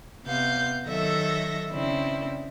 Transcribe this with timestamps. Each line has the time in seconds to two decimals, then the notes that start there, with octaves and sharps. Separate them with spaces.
0.25 C3 B3 F5 G6
0.87 D#3 F#3 A4 E5 A#6
1.71 C#3 C4 D4 E4